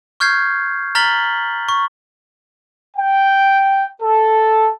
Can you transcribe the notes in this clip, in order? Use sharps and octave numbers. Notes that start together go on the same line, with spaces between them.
C#6 F6 G6 G#6 C7
A#5 F6 A6 B6 F#7 G7
C#6
G5
A4